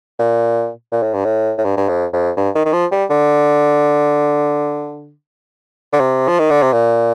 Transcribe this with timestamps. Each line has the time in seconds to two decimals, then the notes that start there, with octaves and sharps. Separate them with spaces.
0.19 A#2
0.92 A#2
1.03 A2
1.14 G2
1.25 A2
1.58 A2
1.65 G2
1.77 G2
1.89 F2
2.13 F2
2.37 G2
2.55 D#3
2.66 D#3
2.73 F3
2.92 G3
3.10 D3
5.93 D3
6.00 C3
6.28 F3
6.39 D#3
6.51 D3
6.62 C3
6.73 A#2